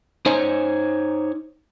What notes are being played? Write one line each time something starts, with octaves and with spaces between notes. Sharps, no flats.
D#4 C5 C#5 G#5